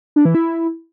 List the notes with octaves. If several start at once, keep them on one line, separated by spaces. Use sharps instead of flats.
D4
E3
E4